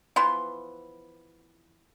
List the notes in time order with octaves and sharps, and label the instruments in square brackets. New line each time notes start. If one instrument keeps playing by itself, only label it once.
[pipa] E3 F3 B3 C6